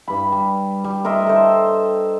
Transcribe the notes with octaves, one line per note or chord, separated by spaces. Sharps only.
G2 B5
G3
G3
A#4 C5 D#5 E5
A4 C5